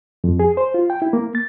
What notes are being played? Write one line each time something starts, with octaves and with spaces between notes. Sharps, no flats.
F2
G#4
C5
F4
G5
E4
A#3
A6